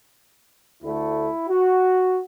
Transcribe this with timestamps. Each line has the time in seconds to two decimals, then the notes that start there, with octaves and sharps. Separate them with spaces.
0.83 D2 D3 A3 E4
1.49 F#4